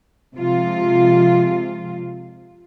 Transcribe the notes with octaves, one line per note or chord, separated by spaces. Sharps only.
C3 F3 G#3 F4